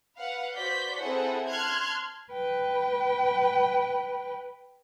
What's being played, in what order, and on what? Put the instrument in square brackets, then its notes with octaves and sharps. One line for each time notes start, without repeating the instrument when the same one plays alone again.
[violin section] B4 F5 F#5
F#4 B4 C5 D5 G6 B6
C4 E4 G#4 A4 C5 F#5
A5 C6 F6 F#6 G#6
[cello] B4 G5